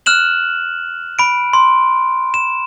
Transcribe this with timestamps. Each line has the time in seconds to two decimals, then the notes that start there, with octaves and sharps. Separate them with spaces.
0.06 F6 F#6 E7 F#7
1.19 B5 D7
1.53 C6
2.34 E7